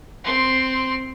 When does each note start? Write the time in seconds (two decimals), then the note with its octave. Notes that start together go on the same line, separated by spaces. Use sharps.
0.24 C4 C6